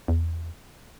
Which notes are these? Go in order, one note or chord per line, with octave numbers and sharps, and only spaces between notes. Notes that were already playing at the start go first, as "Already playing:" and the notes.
E2